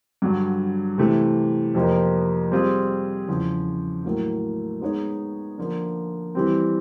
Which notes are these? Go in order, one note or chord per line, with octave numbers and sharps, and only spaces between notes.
G2 D3 F#3
C3 E3 A3
F2 C3 F3 A#3
G3 C4 F4 G#4 C5
E2 C#3 F3
A2 F#3 A#3
G#3 B3 D#4 G#4 C#5
D3 F3 A#3 D4
E3 G3 C4